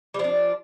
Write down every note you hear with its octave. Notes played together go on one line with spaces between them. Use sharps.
F3 G3 D4